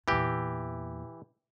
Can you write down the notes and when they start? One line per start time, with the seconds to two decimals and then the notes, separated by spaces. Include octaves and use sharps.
0.08 E2 A#2 E3 G4